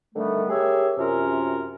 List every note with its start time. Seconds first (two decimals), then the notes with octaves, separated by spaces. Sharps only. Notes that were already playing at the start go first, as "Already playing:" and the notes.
0.15 D3 D#3 G3 A3 B3
0.49 G4 G#4 A#4 C#5 E5
0.98 F#2 C3 C#4 F4 A#4